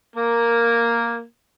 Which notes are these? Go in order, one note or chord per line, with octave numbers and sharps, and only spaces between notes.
A#3 A#4